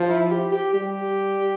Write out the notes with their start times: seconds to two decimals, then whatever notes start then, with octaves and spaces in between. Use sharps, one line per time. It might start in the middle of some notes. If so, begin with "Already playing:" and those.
Already playing: F3
0.09 E4
0.30 G4
0.52 G4
0.74 G3 G4